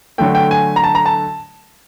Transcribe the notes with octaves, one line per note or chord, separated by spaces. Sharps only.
D3 F#3 A3 G5
G5
G#5
A#5
A5
A#5
A5